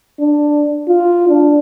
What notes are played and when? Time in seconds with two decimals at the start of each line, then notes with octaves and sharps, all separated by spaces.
0.19 D4
0.88 F4
1.29 D4